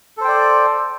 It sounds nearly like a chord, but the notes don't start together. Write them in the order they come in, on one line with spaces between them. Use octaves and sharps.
A4 C5 G5 D5